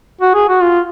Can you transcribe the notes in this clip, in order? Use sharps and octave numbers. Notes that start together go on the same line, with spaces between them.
F#4
G#4
F#4
F4